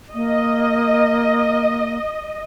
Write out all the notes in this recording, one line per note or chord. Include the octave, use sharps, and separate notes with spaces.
A#3 D#5